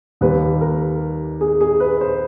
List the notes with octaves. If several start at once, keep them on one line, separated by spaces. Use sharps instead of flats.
D#2 D#3 G3 A#3 B4
A#4
G#4
G#4
B4
C5